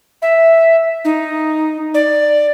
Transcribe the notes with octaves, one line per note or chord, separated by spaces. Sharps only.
E5
D#4
D5